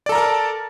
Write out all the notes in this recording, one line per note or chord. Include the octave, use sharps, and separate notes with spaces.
A4 A#4 D5 A5 A#5